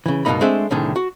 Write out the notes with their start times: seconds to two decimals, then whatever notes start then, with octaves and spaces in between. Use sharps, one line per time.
0.06 C#3 E3
0.25 C#2 G2 B2 A#3 D#4 B5
0.41 G#3 A3 C4 D4 D#5 E5
0.71 C2 A2 D3 D#3 G#4 G#5
0.96 F#4